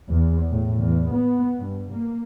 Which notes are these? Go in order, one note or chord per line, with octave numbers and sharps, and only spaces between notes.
E2
A2
E2
B3
G2
A#3